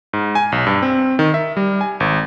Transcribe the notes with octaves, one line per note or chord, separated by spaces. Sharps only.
G#2
G#5
B1
G2
C4
D#3
E5
G3
G#5
G#1